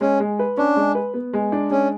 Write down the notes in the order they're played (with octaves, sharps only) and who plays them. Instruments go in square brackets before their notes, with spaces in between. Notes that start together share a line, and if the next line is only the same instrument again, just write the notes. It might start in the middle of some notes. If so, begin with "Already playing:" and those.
[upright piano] G#3 [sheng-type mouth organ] C#4
[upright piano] G#3
B4
[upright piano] C#4 [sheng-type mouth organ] D4
[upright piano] G#3
B4
B3
G#3
D4
[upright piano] G#3 [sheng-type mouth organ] C#4